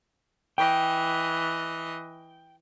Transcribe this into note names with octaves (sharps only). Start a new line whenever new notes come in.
E3 D#5 G5